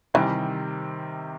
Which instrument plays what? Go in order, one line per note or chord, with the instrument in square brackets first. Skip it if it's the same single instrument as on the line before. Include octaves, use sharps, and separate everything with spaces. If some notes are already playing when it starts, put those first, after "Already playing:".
[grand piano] C3 D#3 G3 [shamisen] E3